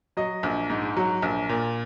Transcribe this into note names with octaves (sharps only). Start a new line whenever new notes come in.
F#3 D#5
A#1
G#2
F#3
A#1
A#2